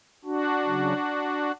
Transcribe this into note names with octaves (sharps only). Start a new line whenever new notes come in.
D4 F#4
C#3 F#3